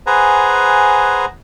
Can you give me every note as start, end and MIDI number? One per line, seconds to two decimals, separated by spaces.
0.07 1.25 68
0.07 1.25 71
0.07 1.25 72
0.07 1.25 78
0.07 1.25 80
0.07 1.25 82